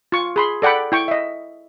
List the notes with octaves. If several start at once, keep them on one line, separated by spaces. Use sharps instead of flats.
F4 C#6
G#4 B5 C6
A4 D5 F#5 G5 B5
E4 G5 C#6
D#5 E5